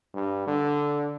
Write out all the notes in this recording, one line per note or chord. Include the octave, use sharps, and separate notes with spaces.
G2
D3